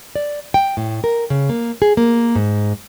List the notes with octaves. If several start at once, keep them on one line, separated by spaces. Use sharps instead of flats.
D5
G5
A2
A#4
C#3
A#3
G#4
A#3
G#2